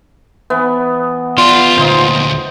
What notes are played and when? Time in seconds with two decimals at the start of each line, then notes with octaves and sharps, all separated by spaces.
0.50 E3 B3
1.38 B3 F4 D5
1.77 D2 A#2 D#4 C5